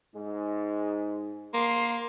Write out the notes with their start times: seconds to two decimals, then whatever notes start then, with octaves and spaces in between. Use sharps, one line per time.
0.15 G#2 G#3
1.54 A#3 C6